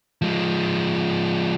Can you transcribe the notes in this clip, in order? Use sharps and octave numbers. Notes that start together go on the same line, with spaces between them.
F3 G#3